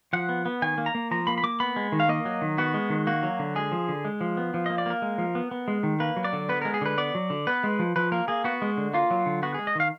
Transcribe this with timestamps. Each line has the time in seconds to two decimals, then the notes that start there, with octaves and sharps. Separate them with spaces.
0.13 F3 F#5
0.29 B3
0.45 B3
0.62 D#3 G#5
0.78 A#3
0.86 A#5
0.95 A#3
1.11 F3 A#5
1.27 A#3 B5
1.38 B5
1.44 A#3 D6
1.60 B3 B5
1.76 G#3
1.92 D#3
2.00 F5
2.09 A#3 D#5
2.25 F#3
2.42 D#3
2.58 B3 F#4
2.74 G#3
2.90 D#3
3.07 A#3 F#4
3.23 F#3
3.39 D3
3.56 G#3 G#4
3.72 F3
3.89 D3
4.05 G#3
4.21 F3
4.37 B3
4.54 F3
4.66 A#3 D#5
4.78 D5
4.86 A#3 A#4
5.02 G#3
5.18 F3
5.35 B3
5.51 B3
5.68 G#3
5.83 D#3
6.00 A#3 B4
6.16 F#3
6.24 D5
6.33 D3
6.49 B3 B4
6.62 G#3 A#4
6.74 G#4
6.81 D3 B4
6.98 B3 D5
7.15 F#3
7.30 D3
7.47 B3 B4
7.64 G#3
7.79 F3
7.96 F3 B4
8.12 A#3 A#4
8.28 A#3 G#4
8.44 B3 F#4
8.62 G#3
8.77 D3
8.94 A#3 F4
9.11 F#3
9.26 D3
9.43 B3 F#4
9.54 G#3 G#4
9.67 D#5
9.75 D#3 F5